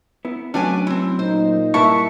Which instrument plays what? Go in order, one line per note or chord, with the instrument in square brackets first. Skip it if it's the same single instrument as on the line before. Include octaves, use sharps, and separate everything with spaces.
[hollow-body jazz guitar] B3 E4
[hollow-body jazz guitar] F#3 A3 C#4 [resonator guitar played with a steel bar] D4 B4 G#5
[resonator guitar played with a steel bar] C4 E4
[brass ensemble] A#2 D#4 [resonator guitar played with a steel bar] C5
[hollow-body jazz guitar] G2 A#3 B4 [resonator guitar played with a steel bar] E4 E5 A5 [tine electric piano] C#6